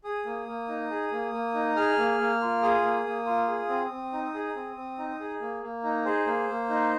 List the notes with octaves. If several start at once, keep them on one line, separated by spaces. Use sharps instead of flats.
G#4 D#6
A#3
A#3
D#4
G#4
A#3
A#3
D#4
G#4 F6
A#3
A#3
F4
G#4 D#6
A#3
A#3
F4
G#4
C4
C4
D#4
G#4
C4
C4
D#4
G#4
A#3
A#3
D#4
G#4 C5
A#3
A#3
D#4